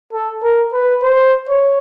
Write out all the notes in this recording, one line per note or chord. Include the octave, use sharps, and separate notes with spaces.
A4
A#4
B4
C5
C#5